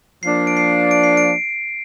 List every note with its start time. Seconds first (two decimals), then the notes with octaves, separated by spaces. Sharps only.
0.23 F3 A#3 D4 C7
0.47 D7
0.57 C7
0.91 D7
1.04 C7
1.17 D7